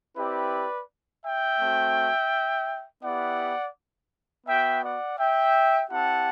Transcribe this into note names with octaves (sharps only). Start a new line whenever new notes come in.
C4 E4 G4 B4 D5
E5 G5
A3 C4 F#4
B3 E4 G4 D5 F#5
B3 F#4 E5 G5
D5 F#5
E5 G5
C4 E4 G4 F#5 A5